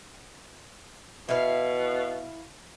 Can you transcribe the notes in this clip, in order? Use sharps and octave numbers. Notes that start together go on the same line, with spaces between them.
B2 E4 F5